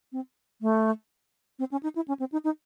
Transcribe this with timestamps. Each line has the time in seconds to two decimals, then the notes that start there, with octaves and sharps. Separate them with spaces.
0.12 C4
0.61 A3
1.59 C4
1.71 C#4
1.83 D#4
1.95 E4
2.08 C#4
2.19 C4
2.32 D#4
2.44 D#4